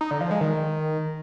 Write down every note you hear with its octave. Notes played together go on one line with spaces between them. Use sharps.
D#4
D3
F3
G#3
D#3